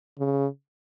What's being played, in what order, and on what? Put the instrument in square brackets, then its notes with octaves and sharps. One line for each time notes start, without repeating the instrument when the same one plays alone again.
[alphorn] C#3